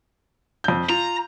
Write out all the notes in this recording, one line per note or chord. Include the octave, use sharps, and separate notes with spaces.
F2 G6
F4 A#5